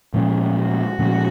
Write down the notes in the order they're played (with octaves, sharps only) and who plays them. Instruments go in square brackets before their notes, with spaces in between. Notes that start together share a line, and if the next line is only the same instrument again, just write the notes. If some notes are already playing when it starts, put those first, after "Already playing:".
[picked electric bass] A#2 F3 G#3 C#4
[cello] F#4
[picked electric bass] A#2 F3 G#3 C#4